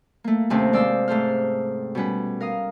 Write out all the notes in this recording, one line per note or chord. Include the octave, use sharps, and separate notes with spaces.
A3 A#3
D#2 C3 A3 C4 C#4
G#3 C5 D5 F5 E6
G#2 A3 A4 C5 F6
B2 G3 C#4 B4
A#4 F5 D#6